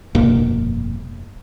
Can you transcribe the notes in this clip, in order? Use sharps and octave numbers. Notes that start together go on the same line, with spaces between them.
F1 G2 B2 A#3